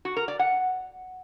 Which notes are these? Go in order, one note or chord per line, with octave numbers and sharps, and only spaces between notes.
F#4
A#4
D5
F#5